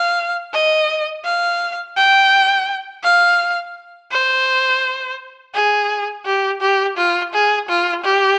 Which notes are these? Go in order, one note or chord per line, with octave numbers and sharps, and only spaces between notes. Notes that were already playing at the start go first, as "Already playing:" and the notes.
Already playing: F5
D#5
F5
G5
F5
C5
G#4
G4
G4
F4
G#4
F4
G4